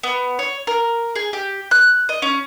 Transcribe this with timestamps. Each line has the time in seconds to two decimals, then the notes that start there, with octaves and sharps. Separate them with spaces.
0.03 B3
0.39 C#5
0.67 A#4
1.16 G#4
1.33 G4
1.71 F#6
2.09 D#5
2.22 C#4